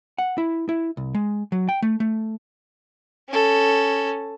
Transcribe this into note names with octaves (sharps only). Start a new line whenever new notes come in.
F#5
E4
E4
C2
G#3
F#3
G5
A3
A3
C#4 A4